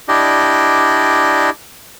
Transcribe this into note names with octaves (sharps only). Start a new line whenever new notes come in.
D4 E4 G4 D5 D#5